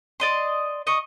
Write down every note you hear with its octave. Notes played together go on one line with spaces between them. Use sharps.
D5 D#5 C6
D#5 C#6